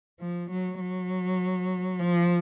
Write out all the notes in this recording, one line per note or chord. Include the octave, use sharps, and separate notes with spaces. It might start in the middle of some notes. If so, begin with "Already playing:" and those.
F3
F#3
F#3
F3